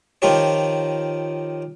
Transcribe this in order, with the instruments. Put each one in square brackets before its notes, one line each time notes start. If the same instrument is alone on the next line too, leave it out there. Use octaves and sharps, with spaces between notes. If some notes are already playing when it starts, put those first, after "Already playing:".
[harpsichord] D#3 F3 D#4 F4 G4 C#5